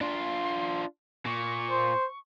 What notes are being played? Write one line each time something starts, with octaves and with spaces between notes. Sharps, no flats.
D4 F4 C6
A#2 C#6
C5